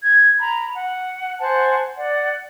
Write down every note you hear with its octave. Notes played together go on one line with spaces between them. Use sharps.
G#6
A#5 B5
F#5
C5 F#5 G#5 A5
D5 F#5